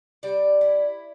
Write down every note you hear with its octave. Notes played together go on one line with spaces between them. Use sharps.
G3 D5
E4